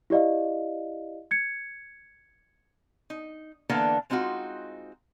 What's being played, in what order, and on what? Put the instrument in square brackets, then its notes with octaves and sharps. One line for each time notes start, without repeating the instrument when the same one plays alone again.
[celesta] E4 G4 D5 D#5 F5
G#6 C#7
[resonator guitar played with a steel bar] D#4
D3 E3 A#3 B3 D4 A4
G#3 C4 D#4 F4 F#4